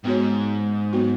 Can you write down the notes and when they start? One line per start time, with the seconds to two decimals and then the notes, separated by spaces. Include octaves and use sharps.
0.04 G#2 B3 F#4 C#5
0.93 F#3 B3 F#4